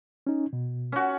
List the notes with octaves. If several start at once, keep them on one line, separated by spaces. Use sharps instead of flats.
C#4 D#4
B2
C#4 F#4